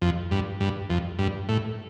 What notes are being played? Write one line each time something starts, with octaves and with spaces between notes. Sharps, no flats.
F2
G2
G2
F2
G2
A2